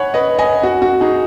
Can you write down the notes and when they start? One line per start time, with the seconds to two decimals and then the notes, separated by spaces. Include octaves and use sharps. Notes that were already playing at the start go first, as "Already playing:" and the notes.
Already playing: C#5 F#5 G#5 B5
0.14 B4 D#5
0.39 D#5 G#5
0.63 F#4
0.82 F#4
1.00 D#4 G#4